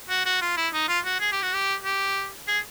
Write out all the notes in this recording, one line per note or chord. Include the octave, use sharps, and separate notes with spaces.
F#4
F#4
F4
E4
D#4
F4
F#4
G#4
G4
F#4
G4
G4
G#4